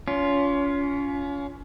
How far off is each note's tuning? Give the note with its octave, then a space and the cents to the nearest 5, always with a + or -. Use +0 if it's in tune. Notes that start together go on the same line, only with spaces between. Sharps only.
C#4 +30 F4 +0